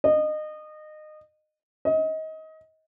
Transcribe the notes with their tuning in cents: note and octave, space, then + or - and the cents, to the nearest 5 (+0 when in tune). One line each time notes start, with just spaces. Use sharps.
D#5 -25
D#5 +25